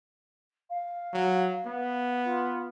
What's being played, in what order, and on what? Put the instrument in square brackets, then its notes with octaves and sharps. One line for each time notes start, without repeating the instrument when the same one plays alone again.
[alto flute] F5
[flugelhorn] F#3
B3
[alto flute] F4